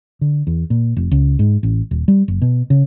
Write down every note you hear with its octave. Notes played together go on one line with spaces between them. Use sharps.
D3
E2
A#2
F1
C#2
G#2
A1
D#1
G3
F#1
B2
C#3